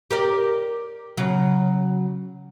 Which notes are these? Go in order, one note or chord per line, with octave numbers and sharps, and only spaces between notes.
G4 A#4 D5
C#3 F#3